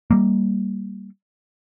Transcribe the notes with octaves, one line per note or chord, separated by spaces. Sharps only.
G3 A#3